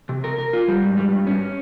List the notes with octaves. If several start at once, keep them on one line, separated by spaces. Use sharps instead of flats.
C3
A#4
A#4
F4
G3
G#2
G3
G2
C#4